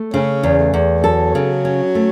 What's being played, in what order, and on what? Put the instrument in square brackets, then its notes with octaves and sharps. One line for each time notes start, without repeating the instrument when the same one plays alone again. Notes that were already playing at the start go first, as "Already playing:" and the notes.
Already playing: [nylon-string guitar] A3
[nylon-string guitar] C#3 [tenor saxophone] C#4
[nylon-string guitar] E2
[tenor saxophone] A3
[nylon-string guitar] E2
[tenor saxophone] A3
[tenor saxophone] F#3 [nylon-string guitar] A4
[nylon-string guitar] C#3
C#4
A3